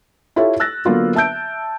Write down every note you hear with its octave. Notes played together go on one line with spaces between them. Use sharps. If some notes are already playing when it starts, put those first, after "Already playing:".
E4 F4 G4 A4 C#5 E5
E6 F#6 A6 A#6
D3 F#3 A#3 B3 F4 F#4
E5 A5 E6 G6 D7